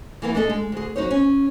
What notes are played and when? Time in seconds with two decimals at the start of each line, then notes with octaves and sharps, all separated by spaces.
0.22 E3 A#3 B3
0.35 A3 D4 G#4 A4 C#5 D#5
0.50 G#3
0.72 D2 G#4
0.96 F#3 D#4 C5 C#5
1.11 C#4